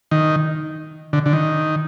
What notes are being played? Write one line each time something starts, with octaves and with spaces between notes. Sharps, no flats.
D#3
D3
D3
D#3